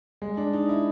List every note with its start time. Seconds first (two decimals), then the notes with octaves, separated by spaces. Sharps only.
0.22 G#3
0.37 D4
0.53 D#4
0.69 E4